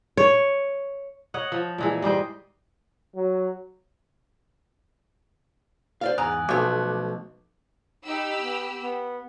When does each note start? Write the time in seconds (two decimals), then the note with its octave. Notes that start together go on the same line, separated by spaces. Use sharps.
0.17 C#5
1.34 C#5 D#5 F#5
1.52 F3
1.78 A#2 E3 G#3
2.02 G#2 G3 C5 D#5
3.15 F#3
6.01 C5 D5 F5
6.18 E2 G#2 G#5 A#5 D#6 F#6
6.49 B1 F3 A3 D6 F#6
8.05 D#4 G4 B5 E6
8.39 B3
8.80 B3